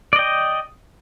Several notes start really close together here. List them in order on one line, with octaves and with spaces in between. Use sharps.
D5 D#5 G5